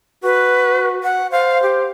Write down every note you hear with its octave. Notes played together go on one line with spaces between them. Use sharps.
F#4 B4
F#5
C5 F5
G4